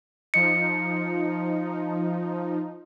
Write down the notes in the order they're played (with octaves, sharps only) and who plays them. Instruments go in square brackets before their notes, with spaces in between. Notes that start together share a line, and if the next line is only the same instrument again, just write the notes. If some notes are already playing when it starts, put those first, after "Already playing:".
[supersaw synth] F3 D#4 [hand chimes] C#7